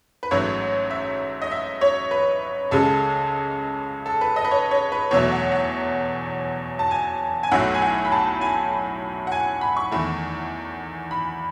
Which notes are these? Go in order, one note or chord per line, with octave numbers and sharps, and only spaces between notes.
B4
A1 G#2 F#3 A3 C#5
E5
D#5
E5
C#5
B4
C#2 C#3 G#3 A4
A4
B4
D#5
B4
C#5
C#5
B4
E2 B2 F#3 A3 C#5
F#5
F#5
A5
G#5
G#5
B1 A2 F#3 A3 F#5
G#5
F#5
B5
A5
G#5
F#5
G#5
B5
C#6
E2 D#3 A3
B5